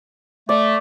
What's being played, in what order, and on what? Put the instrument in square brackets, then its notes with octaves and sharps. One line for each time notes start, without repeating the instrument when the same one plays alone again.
[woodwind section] A3 [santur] D5